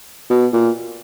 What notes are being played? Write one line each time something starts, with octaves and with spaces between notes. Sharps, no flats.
B2
A#2